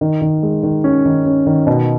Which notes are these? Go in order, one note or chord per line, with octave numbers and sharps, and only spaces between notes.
D#3
D#3
G#3
D#3
C#4
D#3
C#4
D#3
B2